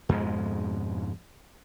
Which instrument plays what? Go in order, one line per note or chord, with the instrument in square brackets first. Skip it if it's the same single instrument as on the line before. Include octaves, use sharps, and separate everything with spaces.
[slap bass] F2 G#2 B2 G#3